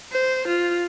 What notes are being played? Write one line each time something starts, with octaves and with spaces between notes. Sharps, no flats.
C5
F4